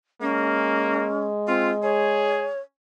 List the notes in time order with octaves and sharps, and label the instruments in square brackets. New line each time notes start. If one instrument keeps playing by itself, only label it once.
[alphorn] G#3 [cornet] A#3 [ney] C#4
[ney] C4 [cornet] F4
[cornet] G#4 [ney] C#5